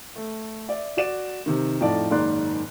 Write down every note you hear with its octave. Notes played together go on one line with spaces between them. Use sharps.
A3
D5 E5
F#4 D5 E7
C3 D#3
F2 A2 D#4 F4 D5 A5
F#1 G#2 D#3 D5 C6 F#6